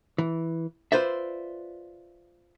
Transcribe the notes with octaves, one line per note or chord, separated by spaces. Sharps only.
E3
F4 B4 C5 D5 E5